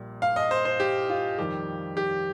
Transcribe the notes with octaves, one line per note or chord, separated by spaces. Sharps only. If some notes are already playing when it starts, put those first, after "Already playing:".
Already playing: A#1 A#2 G3
F5
D#5
C5
C5
G4
F4
F2 D#3 G3 G4
G4